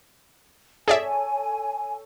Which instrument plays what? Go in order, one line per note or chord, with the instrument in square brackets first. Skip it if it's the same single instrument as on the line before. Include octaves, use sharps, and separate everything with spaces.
[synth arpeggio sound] G#4 D5 E5 [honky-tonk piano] A4 C#5 [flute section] G#5